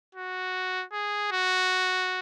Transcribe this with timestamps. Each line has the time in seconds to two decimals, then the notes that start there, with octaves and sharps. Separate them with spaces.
0.15 F#4
0.93 G#4
1.32 F#4